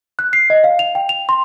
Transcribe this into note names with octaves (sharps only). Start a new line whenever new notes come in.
F#6
C7
D#5
F5
F7
G5
F7
C6